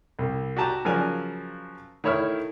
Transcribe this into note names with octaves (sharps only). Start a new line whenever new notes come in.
C2
F#4 G4 A5 A#5
C#3 F3 F#3 A#4 D5 G#5
D#3 A3 E4 C#5 E5 F6